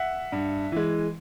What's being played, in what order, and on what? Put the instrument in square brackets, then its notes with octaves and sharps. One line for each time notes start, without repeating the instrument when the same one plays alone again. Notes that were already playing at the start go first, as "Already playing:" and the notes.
Already playing: [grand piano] E5 F#5
G2
E3 G#3